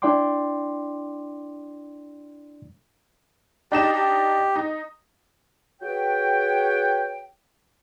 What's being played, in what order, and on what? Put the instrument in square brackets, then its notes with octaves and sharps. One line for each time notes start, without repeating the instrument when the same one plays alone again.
[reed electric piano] D4 E4 D5 G5 C6 D6
[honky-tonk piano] D4 D#4 E7 [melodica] G4
[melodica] G4
[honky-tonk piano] D#4
[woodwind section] F#4 G#4 B4 C#5 G5